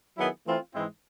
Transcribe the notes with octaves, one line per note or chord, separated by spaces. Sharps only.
D#3 F#3 B3 E4 G#4
E3 A3 C4 F4
G#2 E3 G#3 C4 E4